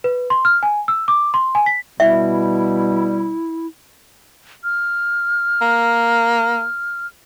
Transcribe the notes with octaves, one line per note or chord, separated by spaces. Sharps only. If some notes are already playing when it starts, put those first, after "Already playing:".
B4
C6
F6
G#5
E6
D6
C6
G#5
B6
B2 G3 E4 E5
F6
A#3